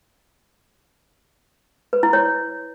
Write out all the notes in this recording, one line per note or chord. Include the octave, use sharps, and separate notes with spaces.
B4
E4
C#5